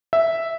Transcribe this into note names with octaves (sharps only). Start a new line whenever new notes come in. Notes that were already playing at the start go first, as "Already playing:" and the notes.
E5